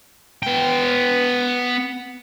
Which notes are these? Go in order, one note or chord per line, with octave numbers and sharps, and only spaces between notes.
B3 G5